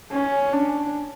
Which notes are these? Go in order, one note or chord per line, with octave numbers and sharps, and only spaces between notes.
C#4
D4